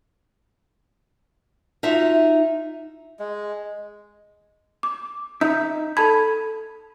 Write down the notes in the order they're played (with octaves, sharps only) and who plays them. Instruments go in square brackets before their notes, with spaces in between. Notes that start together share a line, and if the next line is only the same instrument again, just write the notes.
[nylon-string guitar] D#4 F4 F#4 E5
[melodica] G#3
[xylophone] D6
[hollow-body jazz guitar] D#4 E5 [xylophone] G6
[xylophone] A4 A5 G#6 [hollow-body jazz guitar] B5